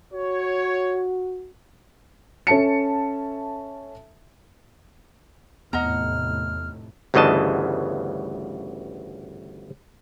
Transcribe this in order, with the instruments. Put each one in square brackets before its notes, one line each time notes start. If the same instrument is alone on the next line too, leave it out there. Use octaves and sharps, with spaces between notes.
[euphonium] F#4 [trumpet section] C#5
[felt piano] C#4 A4 E5 A5 C#7
[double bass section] F1 A2 [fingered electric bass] E2 B3 [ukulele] D#5 F#5 A#5 [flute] F6
[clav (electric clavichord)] G1 D2 C#3 E3 D#5 A5